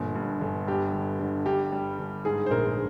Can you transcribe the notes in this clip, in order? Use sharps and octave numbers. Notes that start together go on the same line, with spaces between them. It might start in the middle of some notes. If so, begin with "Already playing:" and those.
Already playing: G1 A#2 F3
G2
G1
G2 G4
D3
D3
G2 G4
G3
G1
G#2 G#4
C5
A#1 A#4